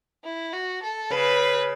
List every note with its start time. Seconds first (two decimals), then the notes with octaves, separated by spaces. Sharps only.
0.24 E4
0.53 F#4
0.83 A4
1.10 C#3 B4